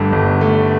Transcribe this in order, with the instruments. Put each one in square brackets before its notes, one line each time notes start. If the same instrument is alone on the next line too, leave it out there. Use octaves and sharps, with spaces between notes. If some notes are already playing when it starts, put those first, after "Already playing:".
Already playing: [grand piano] G1 G2 D3 A3
G1
A3